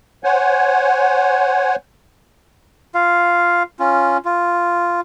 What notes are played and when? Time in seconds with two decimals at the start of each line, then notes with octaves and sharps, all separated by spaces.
0.24 C5 C#5 F#5 G#5
2.95 F4 F5
3.79 C#4 F4
4.25 F4